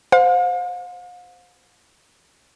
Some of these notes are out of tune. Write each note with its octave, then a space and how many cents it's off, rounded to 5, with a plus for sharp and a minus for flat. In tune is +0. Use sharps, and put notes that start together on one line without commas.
C5 -15 F5 +45